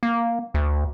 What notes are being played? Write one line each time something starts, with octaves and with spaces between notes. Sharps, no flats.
A#3
D2